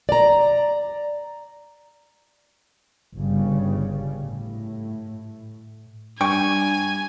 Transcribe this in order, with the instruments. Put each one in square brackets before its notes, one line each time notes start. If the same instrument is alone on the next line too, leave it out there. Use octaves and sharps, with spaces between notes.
[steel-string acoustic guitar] D5 A#5
[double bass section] G1 C#3 G3
A2
[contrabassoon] G2 [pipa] G5 C#6 [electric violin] G#5